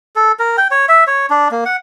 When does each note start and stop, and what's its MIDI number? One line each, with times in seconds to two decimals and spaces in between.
0.16 0.32 69
0.39 0.57 70
0.57 0.68 79
0.71 0.86 73
0.89 1.04 76
1.07 1.26 73
1.30 1.48 62
1.51 1.64 58
1.65 1.77 78